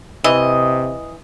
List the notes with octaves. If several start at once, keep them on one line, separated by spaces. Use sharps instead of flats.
C3 E3 D#5